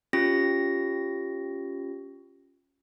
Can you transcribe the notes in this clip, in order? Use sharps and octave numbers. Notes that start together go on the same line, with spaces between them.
C#4 F4 G4 A#6